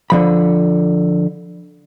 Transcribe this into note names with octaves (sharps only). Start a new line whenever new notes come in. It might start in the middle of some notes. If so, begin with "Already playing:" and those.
D3 F3 B5